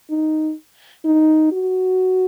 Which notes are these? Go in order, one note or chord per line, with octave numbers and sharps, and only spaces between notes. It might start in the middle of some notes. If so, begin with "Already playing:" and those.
D#4
D#4
F#4